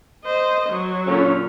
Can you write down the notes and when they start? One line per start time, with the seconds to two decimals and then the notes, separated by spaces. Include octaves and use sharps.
0.24 C5 D#5
0.69 F#3
1.07 A#2 D3 C#4